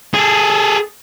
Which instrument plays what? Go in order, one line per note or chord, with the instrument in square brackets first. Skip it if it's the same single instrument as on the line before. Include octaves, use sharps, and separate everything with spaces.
[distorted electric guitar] G#4 A4